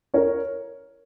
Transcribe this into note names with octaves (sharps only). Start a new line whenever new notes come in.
A#4 C#5